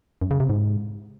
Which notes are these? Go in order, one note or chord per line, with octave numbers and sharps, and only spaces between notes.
F#2
C#3
C3
G#2